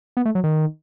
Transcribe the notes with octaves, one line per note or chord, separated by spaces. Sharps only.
B3
A3
F#3
D#3